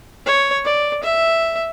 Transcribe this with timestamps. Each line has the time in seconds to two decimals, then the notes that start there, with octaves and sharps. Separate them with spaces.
0.26 C#5
0.65 D5
1.04 E5